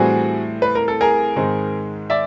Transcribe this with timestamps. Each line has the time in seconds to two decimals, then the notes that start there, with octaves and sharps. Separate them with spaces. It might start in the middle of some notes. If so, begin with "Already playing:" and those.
Already playing: A2 E3 G3 C4 F#4 G#4
0.62 B4
0.75 A#4
0.88 A4
1.01 G#4 A#4
1.36 G#2 D#3 G#3 C4
2.10 D5 E5